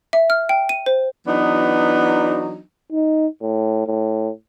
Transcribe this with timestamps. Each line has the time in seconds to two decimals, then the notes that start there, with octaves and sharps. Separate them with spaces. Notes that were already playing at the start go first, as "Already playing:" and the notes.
0.13 E5
0.30 F6
0.49 G5
0.69 D#7
0.86 C5
1.27 E3 F#3 B3 D4 D#4
2.92 D#4
3.42 A2
3.87 A2